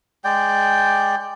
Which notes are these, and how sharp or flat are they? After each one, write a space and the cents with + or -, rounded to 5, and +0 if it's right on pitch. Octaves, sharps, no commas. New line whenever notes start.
G#3 +0 D5 +5 G5 +0